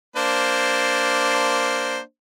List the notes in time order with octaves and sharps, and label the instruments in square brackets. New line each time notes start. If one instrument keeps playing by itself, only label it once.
[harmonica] A#3 D4 C5